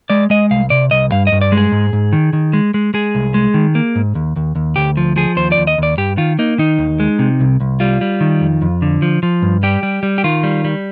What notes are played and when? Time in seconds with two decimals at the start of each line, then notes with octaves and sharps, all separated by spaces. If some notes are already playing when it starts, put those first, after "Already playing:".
0.10 G#3 D5
0.30 G#3 D#5
0.51 C2 F5
0.70 C3 D5
0.91 C2 D#5
1.12 G2 F5
1.27 D#5
1.32 G2
1.41 D5
1.52 G#3
1.57 G#4
1.72 G#2
1.93 G#2
2.13 D#3
2.33 D#3
2.53 G#3
2.74 G#3
2.94 G#3 G#4
3.15 C2
3.34 G#3
3.54 D#3
3.75 A#3
3.95 G#2
4.15 D#2
4.36 D#2
4.55 D#2
4.76 D2 G4
4.97 F3
5.16 F3 G#4
5.36 D#2 C5
5.52 D5
5.58 D#2
5.67 D#5
5.78 D#2 D5
5.97 G2 G4
6.18 D#3 F4
6.39 A#3 D#4
6.58 D#3 D#4
6.79 D#2
7.00 G#3
7.19 C3
7.40 C2
7.60 C2
7.80 G3 F4
8.01 G3
8.21 D#3
8.41 F2
8.62 F2
8.82 D3
9.02 F3
9.23 F3
9.42 G2
9.63 G3 G4
9.83 G3
10.03 G3
10.18 G4
10.24 D#3 F4
10.43 G3
10.65 G3